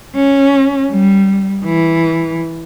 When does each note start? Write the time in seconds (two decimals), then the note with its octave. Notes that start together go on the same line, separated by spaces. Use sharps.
0.16 C#4
0.91 G3
1.65 E3